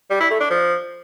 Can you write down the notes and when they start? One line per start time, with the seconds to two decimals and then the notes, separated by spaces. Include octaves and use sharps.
0.11 G3
0.21 E4
0.31 A3
0.41 D4
0.51 F3